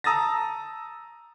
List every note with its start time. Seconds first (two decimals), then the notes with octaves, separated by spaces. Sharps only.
0.04 A5 A#5 D#6 E6 A6 A#6